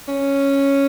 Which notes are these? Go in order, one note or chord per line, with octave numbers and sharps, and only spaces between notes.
C#4